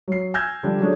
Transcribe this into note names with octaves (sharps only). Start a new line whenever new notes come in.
F#3 C7
G#5 E6 F6 G6 G#6 A#6
D3 F3 G3 D4
F#3 A3 C#4 D4 G#4